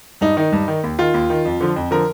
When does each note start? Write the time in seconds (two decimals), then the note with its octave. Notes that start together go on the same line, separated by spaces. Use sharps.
0.21 G2 D#4
0.37 D#3 D#4
0.52 G2
0.68 D#3
0.84 D#2
0.98 D#3 F4
1.14 D#2
1.30 D#3
1.45 F2
1.60 D3 F3
1.76 F2
1.91 D3 F3 A#4